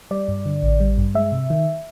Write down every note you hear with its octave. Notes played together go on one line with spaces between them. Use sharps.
G3 D5
G2
D3
A1
G3
G2
G#3 E5
C3
D#3